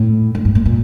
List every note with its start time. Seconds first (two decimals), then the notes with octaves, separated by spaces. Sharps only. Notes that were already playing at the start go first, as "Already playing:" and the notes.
Already playing: A2
0.35 G2
0.45 G2
0.55 A#2
0.65 A#2